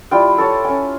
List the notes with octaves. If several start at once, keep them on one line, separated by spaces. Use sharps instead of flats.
G3 E4 F4 G5
A4 C#5 A5
C#4 G#5